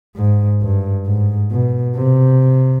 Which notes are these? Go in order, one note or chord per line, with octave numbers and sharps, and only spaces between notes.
G#2
G2
G#2
B2
C3